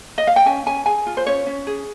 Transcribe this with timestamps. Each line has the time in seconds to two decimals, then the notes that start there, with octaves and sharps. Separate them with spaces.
0.18 D#5
0.27 F5
0.36 G5
0.46 C#4 G#5
0.66 C#4 G#5
0.86 G#4 G#5
1.06 F4
1.17 C5
1.26 C#4 C#5
1.46 C#4
1.67 G#4